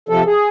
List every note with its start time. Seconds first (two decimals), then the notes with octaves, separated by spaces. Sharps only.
0.09 C3 F3 A4
0.26 G#4